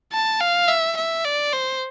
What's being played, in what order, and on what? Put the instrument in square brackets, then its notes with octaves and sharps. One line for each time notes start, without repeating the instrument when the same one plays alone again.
[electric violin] A5
F5
E5
E5
D5
C5